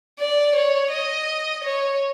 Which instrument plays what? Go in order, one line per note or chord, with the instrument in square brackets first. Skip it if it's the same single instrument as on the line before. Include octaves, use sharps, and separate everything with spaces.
[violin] D5
C#5
D#5
C#5